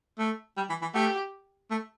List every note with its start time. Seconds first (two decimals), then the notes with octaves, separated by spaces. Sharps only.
0.19 A3
0.57 G3
0.70 E3
0.82 E3
0.94 A3 G4
1.71 A3